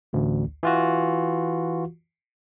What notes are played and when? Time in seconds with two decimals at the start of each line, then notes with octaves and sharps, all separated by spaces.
0.13 A1 D2
0.63 E3 F4 F#4